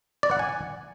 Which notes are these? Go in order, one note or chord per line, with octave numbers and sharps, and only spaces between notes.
D5
F#5
G#5